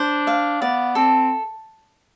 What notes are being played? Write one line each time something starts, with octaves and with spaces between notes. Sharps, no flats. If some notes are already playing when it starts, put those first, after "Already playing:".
Already playing: D4 C5
F5
B3 D5
C4 A4